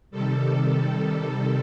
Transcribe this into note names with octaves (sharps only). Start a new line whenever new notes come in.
C3 D#3 G3 A4